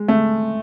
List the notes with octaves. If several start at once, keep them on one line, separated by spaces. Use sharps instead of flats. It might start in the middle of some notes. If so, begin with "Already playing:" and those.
Already playing: G#3
A3